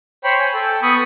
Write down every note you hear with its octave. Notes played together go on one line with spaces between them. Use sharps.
C5 C#5 G5 B5
G#5
A4 G5
B3 B5 C#6 D#6